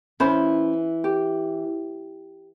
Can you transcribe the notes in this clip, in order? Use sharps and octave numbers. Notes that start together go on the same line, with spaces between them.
E3 C#4 C5 B5
G4